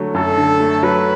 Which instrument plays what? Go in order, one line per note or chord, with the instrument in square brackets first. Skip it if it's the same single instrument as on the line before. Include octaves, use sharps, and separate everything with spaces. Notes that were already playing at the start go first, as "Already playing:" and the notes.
Already playing: [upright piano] D3 F#3 A3
[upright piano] F#2 [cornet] A4
[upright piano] D3
A3
[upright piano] F#3 [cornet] B4